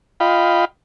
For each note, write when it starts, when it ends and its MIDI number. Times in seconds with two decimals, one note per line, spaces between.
0.20 0.65 65
0.20 0.65 75
0.20 0.65 77
0.20 0.65 79
0.20 0.65 83